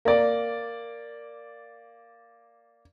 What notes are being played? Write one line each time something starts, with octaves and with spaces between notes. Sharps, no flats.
A#3 D5